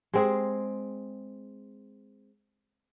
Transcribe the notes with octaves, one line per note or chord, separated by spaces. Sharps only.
G#3 C4 G#4